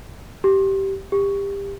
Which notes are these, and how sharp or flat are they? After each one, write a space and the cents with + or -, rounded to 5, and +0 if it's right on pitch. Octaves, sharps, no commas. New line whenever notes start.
G4 -15
G4 +25